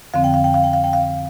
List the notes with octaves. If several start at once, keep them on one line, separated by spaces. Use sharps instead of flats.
F2 D3 F3 C4 F5
G5
F5
G5
F5
G5
F5
G5
F5